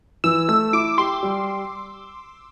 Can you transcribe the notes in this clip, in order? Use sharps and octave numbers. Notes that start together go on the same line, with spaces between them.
E3 E6
A3 E6
E4 D6
G4 C6
G3